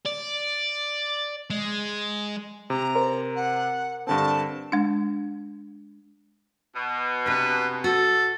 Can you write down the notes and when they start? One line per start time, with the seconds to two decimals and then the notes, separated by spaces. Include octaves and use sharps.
0.06 D5
1.50 G#3
2.70 C3 A#5
2.95 A#4 C5
3.36 F#5
4.07 G2 D3 C4 A5
4.72 G#3 D4
6.76 B2
7.26 C3 D4 B4
7.84 F#4 A4